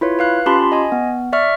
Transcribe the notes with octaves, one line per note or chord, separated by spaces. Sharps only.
E4 F4 B4 C#5
B4 F5 F#6
C#4 F4 G4 A5 B5 C6
D#5 G#5
B3
D5 E5 C#6 F6